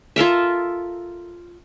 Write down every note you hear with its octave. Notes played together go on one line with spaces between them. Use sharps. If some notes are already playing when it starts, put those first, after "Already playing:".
F4 A4 A#4 E5